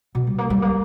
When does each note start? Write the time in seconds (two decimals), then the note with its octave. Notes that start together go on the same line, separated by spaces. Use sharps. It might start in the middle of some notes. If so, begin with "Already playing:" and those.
0.15 B2
0.27 G3
0.38 A#3
0.50 G3
0.62 A#3